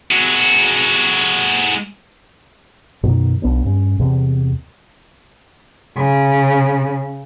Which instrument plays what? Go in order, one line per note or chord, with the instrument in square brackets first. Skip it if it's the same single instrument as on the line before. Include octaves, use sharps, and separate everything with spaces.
[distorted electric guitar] G#3 F#4
[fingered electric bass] F#2 B2 D#3
B1 B3 D4
G2 C#4
E2 C3
[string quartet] C#3